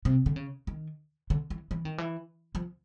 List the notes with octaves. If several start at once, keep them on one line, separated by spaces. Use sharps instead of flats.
C3
D3
C#3
D#3
D3
E3
E3
D#3
E3
F3